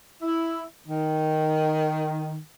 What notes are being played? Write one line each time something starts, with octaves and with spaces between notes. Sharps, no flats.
E4
D#3